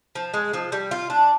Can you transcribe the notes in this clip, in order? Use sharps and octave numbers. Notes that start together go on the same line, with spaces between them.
F3
G#3
F3
G3
F4
D4